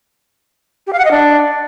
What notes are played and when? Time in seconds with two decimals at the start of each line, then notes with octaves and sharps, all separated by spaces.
0.87 G4
0.93 F5
0.99 F#5
1.05 D#5
1.11 D4